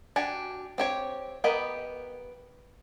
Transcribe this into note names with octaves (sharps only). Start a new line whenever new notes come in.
D4 F#4 G4 G#5
C4 G4 C#5
B3 G4 A#4 D#5 B5